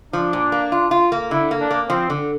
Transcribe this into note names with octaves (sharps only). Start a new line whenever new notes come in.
F3 D4
A#2
A#3
F4
F4
A#3
D3 E4
A#3
D4
A#3
F3 C4
D3